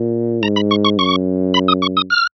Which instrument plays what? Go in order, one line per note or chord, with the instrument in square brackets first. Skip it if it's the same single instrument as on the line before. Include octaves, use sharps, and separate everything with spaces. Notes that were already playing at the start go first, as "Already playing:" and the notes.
Already playing: [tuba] A#2
[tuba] G#2 [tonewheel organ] A#5
[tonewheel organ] B5
C#6
C#6
[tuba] F#2 [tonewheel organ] C#6
[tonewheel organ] B5
D#6
C#6
D#6
F6